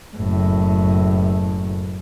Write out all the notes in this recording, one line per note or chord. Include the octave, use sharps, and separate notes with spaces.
F#1 A2